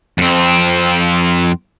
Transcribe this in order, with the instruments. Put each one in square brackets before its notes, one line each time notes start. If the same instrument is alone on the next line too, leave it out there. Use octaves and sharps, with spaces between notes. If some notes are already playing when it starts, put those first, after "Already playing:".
[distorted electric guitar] F2 C4